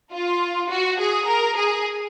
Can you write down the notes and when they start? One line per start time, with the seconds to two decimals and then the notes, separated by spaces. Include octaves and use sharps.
0.12 F4
0.70 F#4
0.99 G#4
1.27 A#4
1.57 G#4